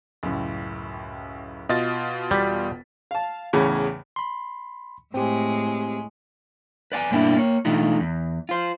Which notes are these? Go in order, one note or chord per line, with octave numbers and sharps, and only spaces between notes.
C#2 F#2 A2
B2 F4 D#5 A6
E1 G3 B6
F5 A5
E2 A2 C#3
B5 C6
A2 G#3 C4 G4
B4 D5 F5 G#5
G2 B2 A#3 C#4 D4 E4
A#3 C#5
B2 E3 A3 D4 D#4 F4
E2
F4 C5